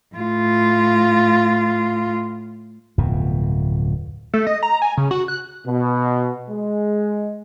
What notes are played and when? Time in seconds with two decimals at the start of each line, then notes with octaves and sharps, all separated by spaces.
0.15 A2 F4
2.98 D1 F2 B2
4.34 A3
4.47 D#5
4.63 A#5
4.82 G#5
4.97 C#3
5.11 F#4
5.28 F#6
5.66 B2
6.50 G#3